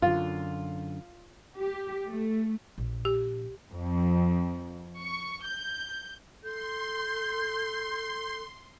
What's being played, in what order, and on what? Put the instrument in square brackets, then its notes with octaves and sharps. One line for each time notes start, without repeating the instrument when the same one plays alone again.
[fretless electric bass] F#2 D3 [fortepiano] F4
[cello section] G4
A3
[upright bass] A#1
[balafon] G4
[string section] F2
C#6
G6
[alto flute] A4 [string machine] C6 [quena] G6